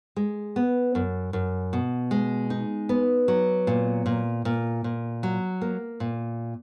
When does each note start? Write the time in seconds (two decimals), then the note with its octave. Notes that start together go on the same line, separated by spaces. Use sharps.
0.16 G#3
0.56 B3
0.95 F#2
1.33 F#2
1.73 B2
2.11 G#3
2.50 D#4
2.89 B3
3.28 F#3
3.67 A#2
4.06 A#2
4.45 A#2
4.84 A#2
5.23 F#3
5.62 A#3
6.00 A#2